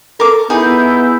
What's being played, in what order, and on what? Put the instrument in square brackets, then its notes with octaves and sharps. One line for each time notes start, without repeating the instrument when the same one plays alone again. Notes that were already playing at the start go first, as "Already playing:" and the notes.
[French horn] A4 [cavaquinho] A#4 D6
[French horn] B3 [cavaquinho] D#4 G#4 [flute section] E4 G6